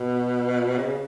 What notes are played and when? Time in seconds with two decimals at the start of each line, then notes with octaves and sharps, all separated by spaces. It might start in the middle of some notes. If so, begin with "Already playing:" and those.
Already playing: B2
0.78 C#3